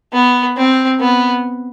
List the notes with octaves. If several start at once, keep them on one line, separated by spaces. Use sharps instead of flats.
B3
C4
B3